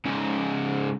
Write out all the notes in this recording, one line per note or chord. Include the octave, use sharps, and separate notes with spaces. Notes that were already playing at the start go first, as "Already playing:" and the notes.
G#2 C#3